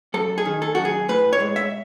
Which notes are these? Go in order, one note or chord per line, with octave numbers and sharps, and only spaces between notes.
F#2 A4
G#4
D#3
A4
F#2 F#4
G#4
A2 B4
C#5
G#3
E5